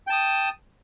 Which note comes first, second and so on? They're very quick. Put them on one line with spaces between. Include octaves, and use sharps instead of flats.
G5 A5 D#6